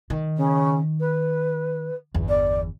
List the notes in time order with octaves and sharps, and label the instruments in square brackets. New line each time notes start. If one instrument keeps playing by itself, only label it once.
[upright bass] D#3
[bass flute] C#3
B4
[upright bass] G1 E2
[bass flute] D5